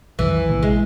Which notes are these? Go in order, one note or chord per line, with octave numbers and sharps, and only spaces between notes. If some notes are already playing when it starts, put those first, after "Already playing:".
B1 F2 D#3 E3
A1 C3 A#3
A#1 G#3